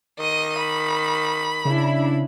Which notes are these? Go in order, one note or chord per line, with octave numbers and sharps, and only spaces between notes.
D#3 D#5 D#7
B5
C#3 D4 E4